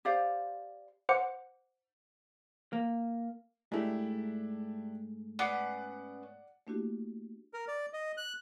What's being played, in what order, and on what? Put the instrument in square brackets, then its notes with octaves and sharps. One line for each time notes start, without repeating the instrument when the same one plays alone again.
[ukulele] G4 C5 D5 F5
[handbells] C5 F#5 D6 C#7
[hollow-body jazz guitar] A#3
[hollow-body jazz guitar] G#2 A3 [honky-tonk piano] D4 E4 G4
[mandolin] B3 C#4 D6 [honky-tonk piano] D5 F#5 C7
[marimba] A3 A#3 D4 E4 F#4 G4
[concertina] A#4
D5
D#5
F#6